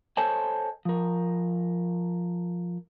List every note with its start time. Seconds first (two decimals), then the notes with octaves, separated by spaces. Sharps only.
0.17 A4 C5 C#5 D#5 G#5 A5
0.85 F3 A#4